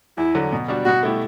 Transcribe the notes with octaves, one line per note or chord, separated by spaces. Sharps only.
E2 E4
D3 F#3
B2
G3 D4 F#4
B2 F#4
A3 E4 G4